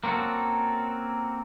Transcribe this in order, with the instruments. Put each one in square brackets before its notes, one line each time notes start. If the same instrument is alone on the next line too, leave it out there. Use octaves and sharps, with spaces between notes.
[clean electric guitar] A#3 C4 C#4 F#4 A4